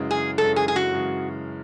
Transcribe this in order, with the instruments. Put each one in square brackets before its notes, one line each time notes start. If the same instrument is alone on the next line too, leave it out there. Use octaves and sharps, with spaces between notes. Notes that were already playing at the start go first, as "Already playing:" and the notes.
Already playing: [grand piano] F#2 C#3 E3 G#3
[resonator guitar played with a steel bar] G#4
[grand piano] F#2 C#3 E3 G#3 [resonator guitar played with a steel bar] A4
[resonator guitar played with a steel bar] G#4
G#4
F#4
[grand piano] F#2 C#3 E3 G#3